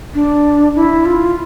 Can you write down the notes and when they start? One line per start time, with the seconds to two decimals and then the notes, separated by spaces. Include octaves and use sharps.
0.14 D4
0.75 E4
1.05 F4